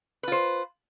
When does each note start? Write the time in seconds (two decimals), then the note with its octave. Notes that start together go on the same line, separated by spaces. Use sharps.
0.23 B4
0.28 F4
0.32 C5